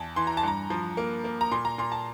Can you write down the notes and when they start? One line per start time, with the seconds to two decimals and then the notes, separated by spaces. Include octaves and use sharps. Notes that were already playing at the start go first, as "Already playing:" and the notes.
Already playing: E2 A5
0.16 E3 C6
0.27 A#5
0.37 A5
0.43 G2 A#5
0.70 F3
0.97 A#3
1.24 A#3
1.41 A#5
1.52 A#2 C6
1.65 A#5
1.78 A#2 C6
1.92 A5